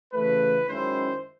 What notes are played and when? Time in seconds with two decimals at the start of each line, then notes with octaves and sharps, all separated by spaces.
0.13 C#3 E3 A3 B4
0.67 F#2 D#3 G#3 C#4 E4 C5